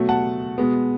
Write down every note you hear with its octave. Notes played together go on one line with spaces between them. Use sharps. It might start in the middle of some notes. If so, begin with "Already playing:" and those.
Already playing: B2 F#3 A3
F#5 A5
B2 G#3 B3